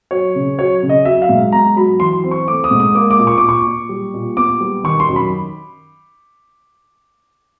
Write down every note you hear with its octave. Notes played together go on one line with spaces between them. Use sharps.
F#3 C#5
C#3
F#3 C#5
C#3
D#5
F#3 E5
F5
G#2
B3 A#5
F#3 B5
E3 C6
C4
C#6
A3 D6
D#6
G#2
D#6
A#3 D6
D6
A#2
C#6
A#2 D6
C#6
A#2
G3
A#2
B3 D6
G3
D#3 C#6
C6
F#2
B5